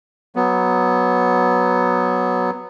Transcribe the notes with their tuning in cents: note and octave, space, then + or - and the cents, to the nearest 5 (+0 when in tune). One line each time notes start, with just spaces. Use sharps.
F#3 +0 B3 +0